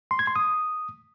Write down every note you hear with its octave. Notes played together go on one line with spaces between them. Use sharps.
C6
G#6
C6
D#6